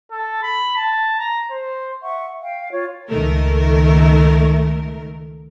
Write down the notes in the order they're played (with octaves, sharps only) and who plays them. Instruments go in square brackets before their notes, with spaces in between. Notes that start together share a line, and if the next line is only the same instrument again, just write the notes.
[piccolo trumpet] A4
B5
A5
A#5
C5
[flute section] E5 F#5 C#6
F5 G5
F4 C#5
[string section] C#2 D#3 A3 A#4